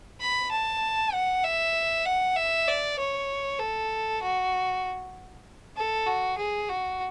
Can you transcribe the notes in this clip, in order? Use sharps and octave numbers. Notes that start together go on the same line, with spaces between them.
B5
A5
F#5
E5
F#5
E5
D5
C#5
A4
F#4
A4
F#4
G#4
F#4